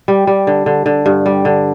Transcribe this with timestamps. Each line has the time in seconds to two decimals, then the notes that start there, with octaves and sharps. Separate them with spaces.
0.08 G3
0.27 G3
0.47 D3
0.66 D3
0.86 D3
1.06 G2
1.26 G3
1.45 D3